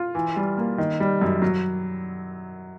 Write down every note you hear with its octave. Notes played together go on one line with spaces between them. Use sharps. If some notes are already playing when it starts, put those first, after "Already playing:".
Already playing: F4
E3
G3
A#3
D#3
G3
F#2
F#3